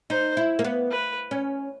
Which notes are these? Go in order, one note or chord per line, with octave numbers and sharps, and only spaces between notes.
D#4 C5
E4
A#3
B3
B4
C#4